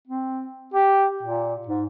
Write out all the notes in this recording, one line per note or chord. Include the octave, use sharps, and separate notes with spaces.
C4
G4
A#2
G#2